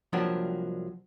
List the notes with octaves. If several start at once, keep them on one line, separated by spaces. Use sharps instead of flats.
C2 F3 F#3 A#3 D4 G4